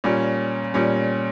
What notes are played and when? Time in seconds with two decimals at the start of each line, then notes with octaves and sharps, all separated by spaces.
0.04 A#2 G3 C#4
0.74 A#2 G3 C#4